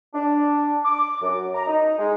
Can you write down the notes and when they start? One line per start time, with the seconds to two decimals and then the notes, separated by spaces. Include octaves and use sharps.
0.15 D4
0.85 D6
1.22 F#2
1.54 A#5
1.67 D#4
1.99 G#3